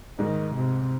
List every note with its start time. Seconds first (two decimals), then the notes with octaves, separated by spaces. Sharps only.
0.19 G#2 D#3 G#3
0.55 C3